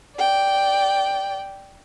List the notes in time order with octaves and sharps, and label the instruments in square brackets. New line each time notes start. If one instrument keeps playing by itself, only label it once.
[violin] D5 G5